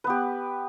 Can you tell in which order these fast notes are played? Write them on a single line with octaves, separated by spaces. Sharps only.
B4 B3 G4